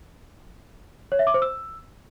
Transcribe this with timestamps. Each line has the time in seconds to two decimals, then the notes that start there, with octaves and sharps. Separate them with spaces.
1.12 C#5
1.19 E5
1.27 D6
1.34 C5
1.42 E6